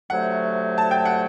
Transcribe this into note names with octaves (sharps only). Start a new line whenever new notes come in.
D2 C3 F#3 A3 F#5
A5
G5
F#5